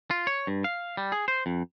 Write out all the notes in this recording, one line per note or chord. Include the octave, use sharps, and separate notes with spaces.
F4
C#5
G2
F5
G3
G#4
C5
F2